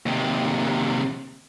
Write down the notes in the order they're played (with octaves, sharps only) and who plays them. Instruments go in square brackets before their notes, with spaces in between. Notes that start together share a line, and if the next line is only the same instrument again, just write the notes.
[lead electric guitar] D#2 C3